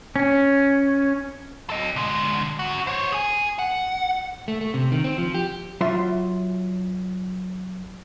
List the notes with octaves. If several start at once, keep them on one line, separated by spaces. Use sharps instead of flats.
C#4
A4 D#5
D3 G#3
F#2 F#4
C5 C#5
G#4 G#5
F#5
A3
A3
C3
D#3
C4
F3
G4
F#3 F4 E5 C6